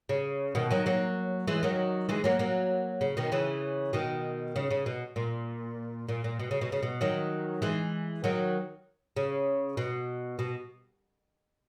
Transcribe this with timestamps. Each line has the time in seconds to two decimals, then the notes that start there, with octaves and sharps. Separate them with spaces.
0.09 C#3
0.55 B2 D#3
0.70 D#3 F#3
0.86 F#3 A#3
1.47 E3 G#3
1.63 D#3 F#3
2.09 E3 G#3
2.24 F#3 A#3
2.39 F#3 A#3
3.01 C#3
3.17 B2 D#3
3.32 C#3 E3
3.93 B2 D#3
4.56 C#3
4.71 C#3
4.86 B2
5.16 A#2
6.09 A#2
6.24 A#2
6.39 B2
6.51 C#3
6.61 B2
6.72 C#3
6.83 B2
7.01 D#3 F#3
7.62 E3 G#3
8.24 D#3 F#3
9.16 C#3
9.77 B2
10.39 B2